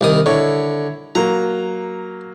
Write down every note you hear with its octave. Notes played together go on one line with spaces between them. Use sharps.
C2 D#3 D#6
D3 E4 C#5 C#6
F#3 A#3 A#5